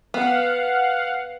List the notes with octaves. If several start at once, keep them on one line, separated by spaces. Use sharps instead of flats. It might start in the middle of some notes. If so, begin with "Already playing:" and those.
B3 F5 F#5